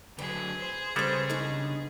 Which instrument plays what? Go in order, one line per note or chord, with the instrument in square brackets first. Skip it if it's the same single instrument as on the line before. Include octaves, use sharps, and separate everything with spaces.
[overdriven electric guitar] D3 F#3 [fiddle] G#4 [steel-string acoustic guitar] B4
[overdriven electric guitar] C5
[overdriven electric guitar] C#3 [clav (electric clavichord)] G3 G#3 A4 [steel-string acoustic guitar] B4 C5
[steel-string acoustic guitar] D#3 B3 D4